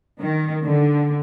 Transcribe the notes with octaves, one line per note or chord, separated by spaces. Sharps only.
D#3
D3